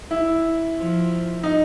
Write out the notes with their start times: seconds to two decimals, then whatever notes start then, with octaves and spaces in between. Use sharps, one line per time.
0.11 E4
0.77 F3
1.43 D#4